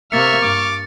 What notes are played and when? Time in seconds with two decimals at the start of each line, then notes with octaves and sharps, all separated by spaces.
0.12 C3 A#3 E5 C#6 F6 A6 C#7
0.42 G2 D6